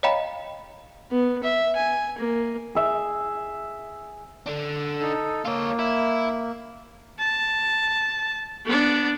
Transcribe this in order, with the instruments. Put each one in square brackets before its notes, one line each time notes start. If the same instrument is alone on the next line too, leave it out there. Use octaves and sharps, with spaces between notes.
[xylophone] C#5 D#5 F5 G5 A#5 B5
[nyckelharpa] B3
E5
G#5
A#3
[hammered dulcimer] G#4 E5
[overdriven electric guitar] D3 D4
[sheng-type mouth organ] D#4 A4
[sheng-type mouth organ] A#3 [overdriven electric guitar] F4 C#5
[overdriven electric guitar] E4
[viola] A5
B3 D4